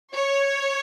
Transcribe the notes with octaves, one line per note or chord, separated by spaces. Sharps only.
C#5